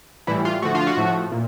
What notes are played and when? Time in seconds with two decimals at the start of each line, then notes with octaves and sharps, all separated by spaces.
0.27 A2 E3 G3 E4
0.45 F4
0.62 D3 F3 A3 F#4
0.75 F4
0.87 F#4
0.97 A2 F3 A3
1.31 A#2